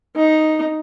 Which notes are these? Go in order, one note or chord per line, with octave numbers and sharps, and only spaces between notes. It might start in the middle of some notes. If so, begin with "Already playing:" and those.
D#4